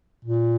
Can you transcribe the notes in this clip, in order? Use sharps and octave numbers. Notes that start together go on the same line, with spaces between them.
A#2